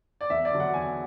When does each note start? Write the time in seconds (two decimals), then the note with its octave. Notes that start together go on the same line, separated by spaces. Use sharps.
0.21 D5
0.30 E2 E5
0.45 D5
0.52 D3 F#3
0.60 F#5
0.74 E2 G#5